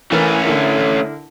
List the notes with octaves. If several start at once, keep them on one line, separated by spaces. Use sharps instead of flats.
E3 A3 C#4 A#4
D3 E4 A#4